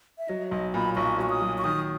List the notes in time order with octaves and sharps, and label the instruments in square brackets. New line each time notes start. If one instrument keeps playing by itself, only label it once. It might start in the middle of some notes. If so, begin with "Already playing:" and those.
[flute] E5
[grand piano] F#3 [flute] D#5
[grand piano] B1 [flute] D#5
[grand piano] A#2 [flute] B5
[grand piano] B1 [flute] C#6
[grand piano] F#3 [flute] C#6
[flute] D#6
[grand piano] F#3
[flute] C#6
[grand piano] D#3 [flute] D#6